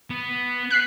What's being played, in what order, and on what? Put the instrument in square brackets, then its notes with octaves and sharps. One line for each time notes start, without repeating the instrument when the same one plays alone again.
[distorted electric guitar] B3
[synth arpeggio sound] F#6 B6 C7